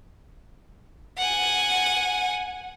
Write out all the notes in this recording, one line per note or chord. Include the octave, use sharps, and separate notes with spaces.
F#5 G#5